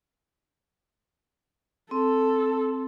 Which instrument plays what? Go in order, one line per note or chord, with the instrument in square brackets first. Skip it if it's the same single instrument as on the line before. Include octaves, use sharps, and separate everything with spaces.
[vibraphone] C4 [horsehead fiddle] A4